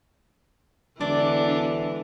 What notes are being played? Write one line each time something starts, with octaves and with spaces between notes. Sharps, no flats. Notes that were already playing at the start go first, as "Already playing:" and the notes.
E1 D3 E3 D4 D5